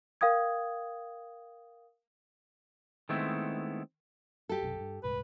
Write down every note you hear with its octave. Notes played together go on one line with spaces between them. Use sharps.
A#4 F5 G5 D#6 G#6
D#3 G#3 A3 B3 C4 E4
G4 A4
B1 F#2 C3
G2
D#1 C2 G#2 B4